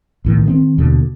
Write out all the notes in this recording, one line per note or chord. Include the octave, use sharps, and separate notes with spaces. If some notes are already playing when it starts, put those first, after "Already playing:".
B1 A2 D#3
D#3 A#3 C4
D#2 B2 D3